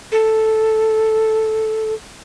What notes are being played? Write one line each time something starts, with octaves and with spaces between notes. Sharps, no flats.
A4